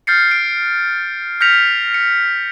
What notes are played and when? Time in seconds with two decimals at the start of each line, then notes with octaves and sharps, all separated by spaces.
0.07 F6 G6 A6 C7 C#7
0.31 D7
1.41 F6 G6 A#6 B6 C#7 F7
1.94 C#7